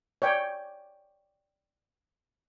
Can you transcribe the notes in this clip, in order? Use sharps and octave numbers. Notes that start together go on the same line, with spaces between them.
C#5 D5 G5